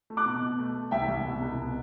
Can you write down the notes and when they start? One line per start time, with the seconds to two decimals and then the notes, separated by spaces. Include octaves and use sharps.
0.10 A3
0.17 D6 F#6
0.26 B2
0.42 B2
0.59 A3
0.75 A3
0.91 C2 E5 G5
1.08 C2
1.25 B2
1.42 C2
1.58 B2